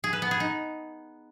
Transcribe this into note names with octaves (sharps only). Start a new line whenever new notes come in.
G#4
B4
B3
G#4
D#4